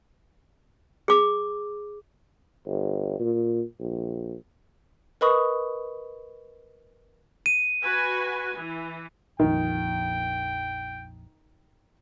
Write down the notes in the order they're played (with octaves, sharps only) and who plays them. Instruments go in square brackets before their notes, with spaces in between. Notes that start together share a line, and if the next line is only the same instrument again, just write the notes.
[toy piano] G#4 D6
[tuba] G1
A#2
A#1
[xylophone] A#4 B4 D#5 B5 C#6 D#6
[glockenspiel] D#7
[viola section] F#4 B4 G#5
E3
[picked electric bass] A#1 F2 [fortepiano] D#3 [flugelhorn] G5